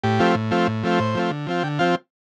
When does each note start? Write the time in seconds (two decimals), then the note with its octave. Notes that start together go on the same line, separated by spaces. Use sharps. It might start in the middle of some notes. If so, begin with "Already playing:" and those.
0.04 A2 G4
0.19 F3 A3 C4 F4
0.35 A2
0.51 F3 A3 C4 F4
0.67 A2
0.83 F3 A3 C4 F4
1.00 A2 C5
1.15 F3 A3 C4 F4
1.31 D3
1.47 F3 C4 F4
1.63 D3 G5
1.79 F3 C4 F4 F5